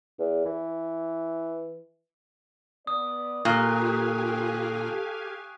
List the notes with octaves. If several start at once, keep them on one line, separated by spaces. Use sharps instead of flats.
E2
E3
B3 D5 D#6
A#2 G4 A4 F5 G#5 C#6 F#6